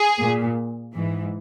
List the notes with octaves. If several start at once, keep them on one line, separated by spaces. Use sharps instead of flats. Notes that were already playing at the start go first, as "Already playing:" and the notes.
Already playing: G#4
A#2
G#2 E3